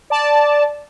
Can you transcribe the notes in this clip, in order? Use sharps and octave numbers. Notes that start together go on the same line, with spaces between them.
D5 A5